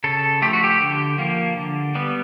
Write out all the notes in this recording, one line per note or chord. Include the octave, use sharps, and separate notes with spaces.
C#3 A4
F3 A3 G4
F#4
G4
D3
F3 A#3
D3
G3 B3